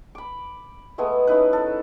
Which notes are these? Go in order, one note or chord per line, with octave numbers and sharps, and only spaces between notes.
B5 D6
G#3 A3 B3 G#4
C#4 D#4 E4 B4
A4